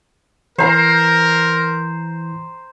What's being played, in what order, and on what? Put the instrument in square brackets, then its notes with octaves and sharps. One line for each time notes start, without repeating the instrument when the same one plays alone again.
[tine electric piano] E3 C7 [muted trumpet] A#4 [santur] C5 A#5